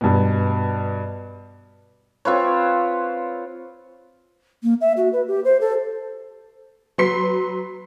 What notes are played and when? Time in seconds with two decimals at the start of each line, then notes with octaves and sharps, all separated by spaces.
0.01 G2 B2
2.25 C4 F4 B4 C#5
4.63 A#3
4.81 E5
4.97 F#4
5.13 B4
5.27 G4
5.44 C5
5.60 A4
6.98 F#3 B4 C6 B6 C7